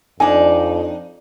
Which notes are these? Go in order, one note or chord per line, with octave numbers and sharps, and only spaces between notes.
F2 D4 D#4 G#5